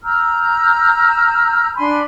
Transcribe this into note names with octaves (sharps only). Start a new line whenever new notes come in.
A#5 E6 F6 G6
D4 G#5 B5 C6